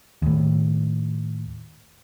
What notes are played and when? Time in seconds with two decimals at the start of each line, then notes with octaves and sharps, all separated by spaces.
0.22 D#2 A2